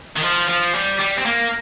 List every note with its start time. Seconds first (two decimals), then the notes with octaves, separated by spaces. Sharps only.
0.17 D#3
0.23 F3
0.48 F3
0.74 G3
1.00 G3
1.19 C4
1.26 A#3